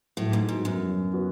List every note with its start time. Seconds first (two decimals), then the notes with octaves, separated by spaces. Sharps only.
0.17 A2 F#3
0.33 G#2
0.49 G#2 B3 F#4
0.65 F#2
0.81 F#3
1.13 B3 F#4